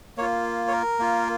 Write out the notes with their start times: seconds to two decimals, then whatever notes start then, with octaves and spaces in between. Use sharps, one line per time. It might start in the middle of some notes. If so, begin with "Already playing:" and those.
0.17 A#3 C#5
0.21 F4
0.68 C#5
0.72 A#4
0.99 A#3 F4